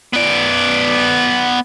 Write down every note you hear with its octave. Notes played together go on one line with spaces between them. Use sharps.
B3 D5